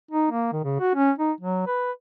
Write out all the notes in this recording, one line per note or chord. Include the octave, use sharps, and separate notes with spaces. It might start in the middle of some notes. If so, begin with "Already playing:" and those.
D#4
A#3
D#3
C#3
F#4
C#4
D#4
F#3
B4